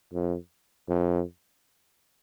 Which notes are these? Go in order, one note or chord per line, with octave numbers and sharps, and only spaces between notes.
F2
F2